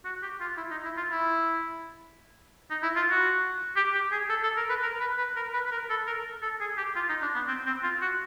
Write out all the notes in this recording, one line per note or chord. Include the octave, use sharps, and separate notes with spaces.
F#4
G4
F4
E4
D#4
E4
F4
E4
D#4
E4
F4
F#4
G4
G4
G#4
A4
A4
A#4
B4
A#4
B4
B4
A#4
B4
B4
A#4
A4
A#4
A4
G#4
G4
F4
D#4
D4
B3
C4
C4
F4
F#4